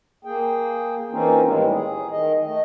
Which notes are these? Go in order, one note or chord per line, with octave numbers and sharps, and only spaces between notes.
A#3 G#4 G5
E3 A#3 C4 C#4 D#4 F4
A2 D#3 E3 G3 G#3
G#4
D#3 D#5
A3 D#5